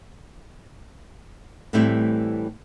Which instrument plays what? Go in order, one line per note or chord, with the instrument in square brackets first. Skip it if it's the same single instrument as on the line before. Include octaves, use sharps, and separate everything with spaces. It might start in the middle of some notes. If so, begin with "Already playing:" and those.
[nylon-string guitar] A2 E3 G3 A3 C4 E4